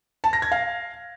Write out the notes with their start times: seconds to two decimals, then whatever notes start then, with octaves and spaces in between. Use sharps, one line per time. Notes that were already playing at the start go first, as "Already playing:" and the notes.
0.24 A5
0.33 A#6
0.42 G#6
0.52 F5